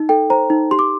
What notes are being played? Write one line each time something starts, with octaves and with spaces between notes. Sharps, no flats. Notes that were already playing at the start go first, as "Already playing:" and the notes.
Already playing: D#4
A4 G5
C5 A#5
D#4
G4 C6
D6